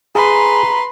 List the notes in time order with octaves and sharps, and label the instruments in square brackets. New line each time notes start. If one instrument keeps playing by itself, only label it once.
[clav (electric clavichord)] G#4 [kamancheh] B4 C6 [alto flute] A#5